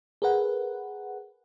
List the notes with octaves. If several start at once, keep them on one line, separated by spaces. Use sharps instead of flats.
G#4 A#4 B4 F#5